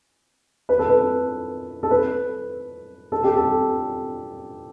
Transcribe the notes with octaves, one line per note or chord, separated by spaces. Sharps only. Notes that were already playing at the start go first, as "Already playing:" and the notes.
B4
A4
B4
A4
B4
A4
G4
A4